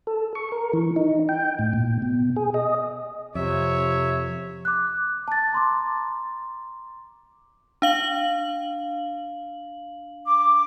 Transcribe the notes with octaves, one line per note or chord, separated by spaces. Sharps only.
A4
C#6
A#4
E3
D#4
G5
A2
A#2
B2
G#4
D#5
F2 C3 C#5 E5
D6 F#6
A5 A6
A#5 C6 D6
D4 F5 F#7
D6